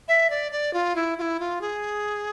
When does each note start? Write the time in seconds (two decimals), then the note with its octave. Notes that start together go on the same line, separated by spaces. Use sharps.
0.08 E5
0.30 D5
0.52 D5
0.74 F4
0.96 E4
1.18 F4
1.22 E4
1.40 F4
1.61 G#4